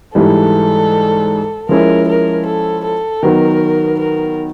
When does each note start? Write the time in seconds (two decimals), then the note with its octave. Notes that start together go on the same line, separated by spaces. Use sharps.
0.15 G#2 E3 G3 A4
1.69 F3 G#3 C#4 E4 A#4
2.08 A#4
2.46 A4
2.85 A4
3.23 D#3 F#3 B3 A#4
3.99 A#4